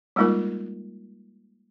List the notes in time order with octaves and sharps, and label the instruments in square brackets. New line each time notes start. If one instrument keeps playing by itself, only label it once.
[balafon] G3 G#3 A#3 D#4 F4 A#4